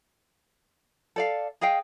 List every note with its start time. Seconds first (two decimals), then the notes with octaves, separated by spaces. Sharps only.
1.16 A4 D5 F5
1.61 G#4 D#5 F5 G5